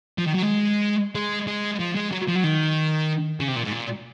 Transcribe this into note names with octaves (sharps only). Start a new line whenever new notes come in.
F3
D#3
F#3
G#3
G#3
G#3
F3
G#3
F#3
F3
F#3
D#3
C#3
C3
A#2
G#2
A#2